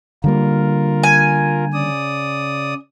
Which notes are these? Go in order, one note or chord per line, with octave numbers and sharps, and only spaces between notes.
D3 G3 A#3 F4 A#4
G#5
C#3 D5 D#6